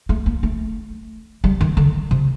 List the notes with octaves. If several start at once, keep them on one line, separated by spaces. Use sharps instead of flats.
A3
A#3
A3
G3
D#3
D3
C3